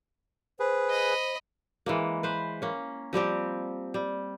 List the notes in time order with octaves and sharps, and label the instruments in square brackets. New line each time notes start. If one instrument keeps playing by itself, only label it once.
[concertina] G#4 B4 [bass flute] C5
[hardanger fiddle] D#5 B5
[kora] E3 G#3 A#3
B4 C5
A#3 C#4
F3 G3 C4 G4
G3